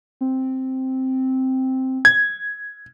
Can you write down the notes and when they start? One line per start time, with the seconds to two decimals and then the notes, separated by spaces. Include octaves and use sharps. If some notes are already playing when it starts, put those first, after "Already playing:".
0.21 C4
2.05 G#6